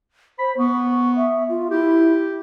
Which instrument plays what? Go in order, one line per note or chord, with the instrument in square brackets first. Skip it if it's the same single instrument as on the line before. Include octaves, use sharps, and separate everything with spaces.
[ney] C5 [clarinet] B5
[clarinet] B3 [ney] C#6
[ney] E5
F4
[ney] E4 [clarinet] G4